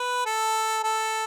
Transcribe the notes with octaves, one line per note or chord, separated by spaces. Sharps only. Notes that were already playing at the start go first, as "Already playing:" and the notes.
Already playing: B4
A4
A4